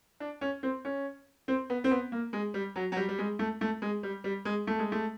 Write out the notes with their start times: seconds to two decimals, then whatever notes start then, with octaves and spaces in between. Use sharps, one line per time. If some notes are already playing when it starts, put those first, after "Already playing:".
0.20 D4
0.41 C#4
0.63 C4
0.85 C#4
1.48 C4
1.70 B3
1.84 C4
1.91 B3
2.12 A#3
2.33 G#3
2.54 G3
2.76 F#3
2.92 F#3
2.97 G3
3.09 G3
3.19 G#3
3.39 A3
3.61 A3
3.82 G#3
4.03 G3
4.24 G3
4.45 G#3
4.67 A3
4.79 G#3
4.92 A3